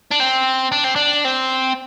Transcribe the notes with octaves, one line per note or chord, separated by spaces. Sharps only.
D4
C4
D4
C4
D4
C4